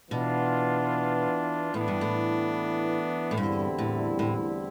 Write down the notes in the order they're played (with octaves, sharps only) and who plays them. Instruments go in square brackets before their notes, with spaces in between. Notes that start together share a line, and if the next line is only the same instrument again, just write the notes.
[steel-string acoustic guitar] B2 [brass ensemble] E3 B3 D4 F4
[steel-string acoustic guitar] A2 [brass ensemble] E3 B3 D4
[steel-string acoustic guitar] G2
A2
A2
[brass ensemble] E2 D3 G3 C4 E4 [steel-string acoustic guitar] G2
[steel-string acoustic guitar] A2
A2